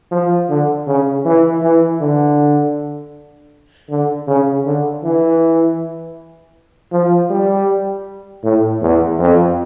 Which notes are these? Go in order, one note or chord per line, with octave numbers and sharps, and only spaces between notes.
F3
D3
C#3
E3
E3
D3
D3
C#3
D3
E3
F3
G3
A2
E2
F2